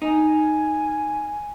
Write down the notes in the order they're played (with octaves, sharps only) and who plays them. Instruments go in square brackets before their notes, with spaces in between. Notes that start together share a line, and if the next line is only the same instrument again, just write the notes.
[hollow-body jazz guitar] D#4 [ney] G#5